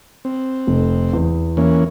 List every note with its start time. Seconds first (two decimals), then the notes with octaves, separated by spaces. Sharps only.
0.25 C4
0.67 F1
1.13 E2
1.57 E3 A#3 C#4